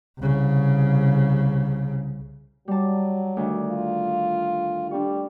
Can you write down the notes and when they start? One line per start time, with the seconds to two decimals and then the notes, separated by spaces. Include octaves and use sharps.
0.18 C2 C#3
2.68 F#3 G3 A5
3.37 D2 D#3
3.67 F4
4.91 G3 D4 C#6